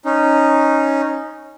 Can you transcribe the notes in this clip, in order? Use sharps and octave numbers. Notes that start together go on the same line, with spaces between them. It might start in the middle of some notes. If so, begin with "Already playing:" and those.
C#4 D#4